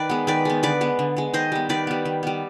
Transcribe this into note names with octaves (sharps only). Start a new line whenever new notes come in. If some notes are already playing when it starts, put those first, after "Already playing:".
Already playing: D#3 B4 D5
G#3 B3
D#3 B4 D5
G#3 B3
D3 B4 D5
G#3 B3
D3
G#3 B3
D#3 C5 D#5
G3 B3
D#3 B4 D5
G3 B3
D#3
G3 B3